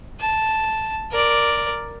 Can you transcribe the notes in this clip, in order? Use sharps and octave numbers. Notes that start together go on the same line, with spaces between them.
A5
A#4 D5